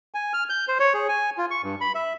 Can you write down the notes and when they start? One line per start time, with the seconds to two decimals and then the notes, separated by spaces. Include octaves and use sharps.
0.14 G#5
0.33 F6
0.49 G6
0.68 C5
0.80 C#5
0.94 G#4
1.09 G#5
1.38 F4
1.51 C#6
1.64 G2
1.81 B5
1.95 E5